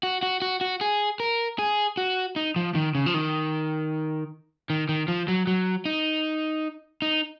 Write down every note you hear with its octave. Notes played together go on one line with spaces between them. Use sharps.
F#4
F#4
F#4
F#4
G#4
A#4
G#4
F#4
D#4
F3
D#3
C#3
F3
D#3
D#3
D#3
F3
F#3
F#3
D#4
D#4